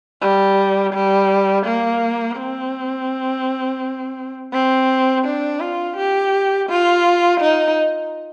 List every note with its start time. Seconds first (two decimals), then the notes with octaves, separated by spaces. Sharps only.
0.22 G3
0.94 G3
1.66 A#3
2.37 C4
4.53 C4
5.25 D4
5.60 F4
5.97 G4
6.69 F4
7.40 D#4